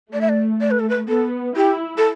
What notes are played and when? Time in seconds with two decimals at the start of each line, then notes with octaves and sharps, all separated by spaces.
0.13 A3 D5
0.21 E5
0.29 D5
0.61 D5
0.71 B4
0.80 A4
0.89 B4
1.08 B3 A4
1.56 E4 G4
1.98 A4